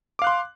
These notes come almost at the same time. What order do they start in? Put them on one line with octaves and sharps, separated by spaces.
D6 F5 F#6 C6